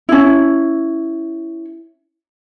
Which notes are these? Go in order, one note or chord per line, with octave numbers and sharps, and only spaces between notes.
C#4 E4